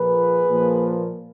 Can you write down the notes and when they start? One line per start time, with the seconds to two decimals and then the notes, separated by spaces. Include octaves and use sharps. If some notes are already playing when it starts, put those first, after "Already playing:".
Already playing: A#2 F3 A#3 G#4 B4
0.49 A#2 F3 A#3